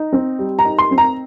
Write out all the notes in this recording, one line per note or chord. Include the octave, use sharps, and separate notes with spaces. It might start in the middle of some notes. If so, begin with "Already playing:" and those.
Already playing: D#4
C4
G3
A#5
D#4
C6
C4
A#5